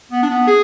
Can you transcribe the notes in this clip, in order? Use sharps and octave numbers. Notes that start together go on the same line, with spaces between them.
B3
D4
B3
G#4